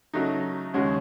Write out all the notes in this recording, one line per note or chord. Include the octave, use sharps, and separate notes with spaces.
C#3 F#3 A3 D#4
D#2 C#3 G#3 C#4 F#4